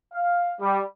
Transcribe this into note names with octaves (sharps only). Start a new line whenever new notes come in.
F5
G3